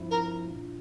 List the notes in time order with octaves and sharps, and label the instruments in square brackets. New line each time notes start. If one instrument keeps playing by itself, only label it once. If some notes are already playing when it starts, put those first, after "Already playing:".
Already playing: [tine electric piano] G2 F3 C4 E4
[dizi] A#4
[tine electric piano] A#2 G3 D4 F4